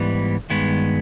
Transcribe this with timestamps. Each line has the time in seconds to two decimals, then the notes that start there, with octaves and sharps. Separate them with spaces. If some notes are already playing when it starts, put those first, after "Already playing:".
Already playing: G#2 E3 G3 B3
0.50 G2 D#3 G#3 B3